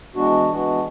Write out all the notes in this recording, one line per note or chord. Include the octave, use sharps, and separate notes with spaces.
E3 G#3 B3 D4 F#4
E3 G#3 B3 D4 F#4